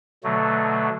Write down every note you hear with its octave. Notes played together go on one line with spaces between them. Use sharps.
B2 D3 F#3 A3